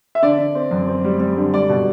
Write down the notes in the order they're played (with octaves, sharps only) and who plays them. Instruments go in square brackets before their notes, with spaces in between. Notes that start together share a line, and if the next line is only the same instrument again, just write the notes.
[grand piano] E5
D3 D5
D3
C4
F#2
C4
G3
G3
D3
G3 D5
B2